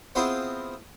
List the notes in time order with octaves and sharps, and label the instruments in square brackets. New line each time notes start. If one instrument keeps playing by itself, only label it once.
[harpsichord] B3 C4 E4 F4 G#4 C5